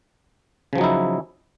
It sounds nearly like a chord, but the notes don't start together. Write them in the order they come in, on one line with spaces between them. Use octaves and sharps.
C#3 F3 F#3 D#4 E4